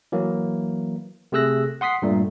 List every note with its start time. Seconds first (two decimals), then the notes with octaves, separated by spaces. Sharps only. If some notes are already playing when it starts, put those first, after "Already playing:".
0.12 E3 F#3 A#3
1.32 C3 A3 G#4 E6 F#6 A#6
1.81 F#5 C6 D#6 B6 C7
2.02 G2 A#2 A3